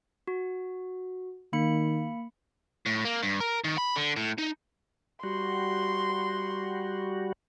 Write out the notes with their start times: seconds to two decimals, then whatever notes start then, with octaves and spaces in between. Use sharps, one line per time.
0.27 F#4
1.53 D#3 A#3 B5 C#7
2.86 A2
3.05 A#3
3.23 G2
3.40 A#4
3.64 D#3
3.78 B5
3.96 D3
4.16 A2
4.38 D#4
5.23 G3 F#4 C6